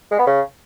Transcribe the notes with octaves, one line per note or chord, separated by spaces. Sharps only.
G#3
B3
C#3